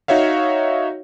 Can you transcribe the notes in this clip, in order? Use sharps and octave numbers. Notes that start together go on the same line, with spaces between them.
D#4 F#4 C#5 E5 F5